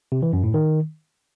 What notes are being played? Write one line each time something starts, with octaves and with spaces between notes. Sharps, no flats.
C3
E3
F#2
A2
D#3